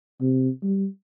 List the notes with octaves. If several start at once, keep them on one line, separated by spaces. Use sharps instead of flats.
C3
G3